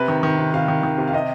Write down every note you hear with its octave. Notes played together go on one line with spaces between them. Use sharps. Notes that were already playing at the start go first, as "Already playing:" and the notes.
Already playing: C3 B4
D#3
D#3
C3
C3 F5
D#3
D#3
C3
F5
C3 D#5